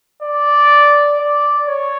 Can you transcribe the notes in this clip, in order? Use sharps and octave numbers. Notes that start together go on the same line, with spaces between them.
D5
D5
C#5